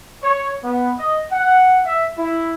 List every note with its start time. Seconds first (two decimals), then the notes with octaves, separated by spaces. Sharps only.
0.23 C#5
0.63 B3
0.99 D#5
1.32 F#5
1.86 E5
2.18 E4